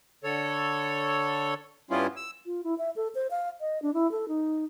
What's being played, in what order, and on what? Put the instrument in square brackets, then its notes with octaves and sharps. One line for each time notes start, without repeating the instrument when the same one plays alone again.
[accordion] D3 A4 C#5
G2 G3 B3 C#4 E4 F4
E6
[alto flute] F4
E4
E5
A4
C5
F5
D#5
D4
E4
A4
D#4